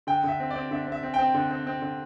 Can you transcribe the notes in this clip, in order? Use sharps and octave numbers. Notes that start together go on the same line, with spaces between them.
D3 G5
D3 E5
C4
D5
C4
D3 E5
C4
E5
C4
C4 G5
D3
C4
C4
D3